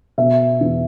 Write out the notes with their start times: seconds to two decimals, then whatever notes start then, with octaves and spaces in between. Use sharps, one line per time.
0.18 B2 E5
0.61 E2